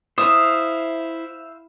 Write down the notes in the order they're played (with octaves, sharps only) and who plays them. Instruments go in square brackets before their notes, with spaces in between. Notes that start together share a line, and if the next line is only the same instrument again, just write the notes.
[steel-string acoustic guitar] E4 [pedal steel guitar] C5 E5 F5 [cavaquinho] D#6